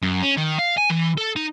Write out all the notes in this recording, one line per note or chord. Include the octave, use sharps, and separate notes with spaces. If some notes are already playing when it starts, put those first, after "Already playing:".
F#2
C#4
D#3
F5
G#5
E3
A4
D#4